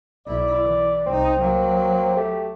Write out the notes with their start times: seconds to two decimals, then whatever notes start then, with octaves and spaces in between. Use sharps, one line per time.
0.27 B1 E4 D5
0.64 E3
1.07 C2 C4 D#4
1.40 F#3 A#3
2.17 A3 G4